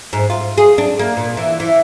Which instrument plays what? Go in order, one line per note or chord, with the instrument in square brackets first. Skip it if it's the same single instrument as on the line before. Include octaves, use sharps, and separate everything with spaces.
[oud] G#2
F4
G#4
D4
A#3
A#2
E3
E3